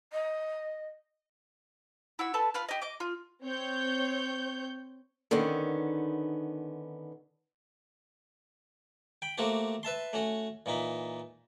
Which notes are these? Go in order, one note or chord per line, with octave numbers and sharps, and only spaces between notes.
D#5
E4 F#4 E6
A4 B4 A5
F4 B4 F6
G4 D#5
D#5 D6
F4
C4 C#5 G6
D3 D#3 B3 C#4
G5 B5
A3 A#3 C4 F#4 G4
B4 E5 A5 C6
A3 C#4 F#4
A#2 E3 D#4 B5